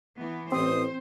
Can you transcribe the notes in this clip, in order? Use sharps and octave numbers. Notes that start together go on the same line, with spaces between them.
E3 B3
A1 C4 C5 D#6